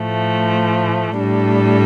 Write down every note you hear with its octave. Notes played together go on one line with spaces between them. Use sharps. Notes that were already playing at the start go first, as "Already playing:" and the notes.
Already playing: A2 F3 A3
A2 G3 D4 A4